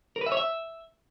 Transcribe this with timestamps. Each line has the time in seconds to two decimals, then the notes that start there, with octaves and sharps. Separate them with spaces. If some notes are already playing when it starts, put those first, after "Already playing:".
0.16 A#4
0.21 B4
0.26 E5
0.32 C#5
0.37 E5